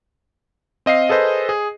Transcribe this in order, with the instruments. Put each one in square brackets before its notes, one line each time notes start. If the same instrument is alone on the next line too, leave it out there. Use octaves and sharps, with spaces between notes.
[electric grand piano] C4 D#5 F5 C7
G#4 A4 B4 C5 D#5
G#4